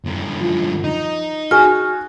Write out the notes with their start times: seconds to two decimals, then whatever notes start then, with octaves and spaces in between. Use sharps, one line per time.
0.05 F#2 D3
0.41 F3
0.84 D#4
1.51 F#4 G#4 G#5 F6